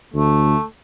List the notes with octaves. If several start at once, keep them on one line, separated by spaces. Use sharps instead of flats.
D2 A3